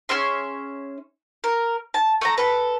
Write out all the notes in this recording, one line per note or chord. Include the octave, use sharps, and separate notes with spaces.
C#4 G#4 E5 C6
A#4
A5
A3 A4 A#5
A4 B4